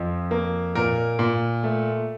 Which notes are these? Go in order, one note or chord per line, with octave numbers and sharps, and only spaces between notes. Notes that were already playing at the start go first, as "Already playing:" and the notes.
Already playing: F2 F3
A#3
A#2 A#4
A#2
A3